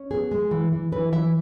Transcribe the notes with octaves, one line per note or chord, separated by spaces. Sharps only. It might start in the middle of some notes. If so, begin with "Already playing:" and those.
Already playing: C#4
B3 G#4
G#3
E3
E3
E3 B4
E3 E5